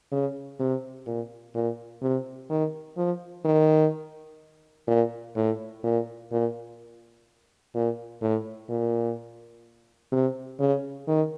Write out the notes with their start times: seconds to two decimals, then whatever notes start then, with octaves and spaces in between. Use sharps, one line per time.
0.12 C#3
0.60 C3
1.07 A#2
1.54 A#2
2.02 C3
2.50 D#3
2.97 F3
3.45 D#3
4.88 A#2
5.36 A2
5.84 A#2
6.32 A#2
7.75 A#2
8.21 A2
8.70 A#2
10.12 C3
10.59 C#3
11.07 D#3